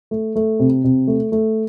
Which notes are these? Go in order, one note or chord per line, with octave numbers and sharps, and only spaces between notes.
A3
A3
C3
C3
A3
A3